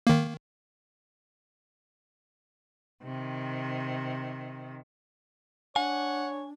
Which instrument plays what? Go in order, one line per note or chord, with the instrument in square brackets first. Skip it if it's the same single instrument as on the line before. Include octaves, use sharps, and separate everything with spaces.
[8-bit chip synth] D#3 A#3
[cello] C3 D#3
[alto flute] D4 [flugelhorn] C#5 [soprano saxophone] F#5 [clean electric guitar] G#5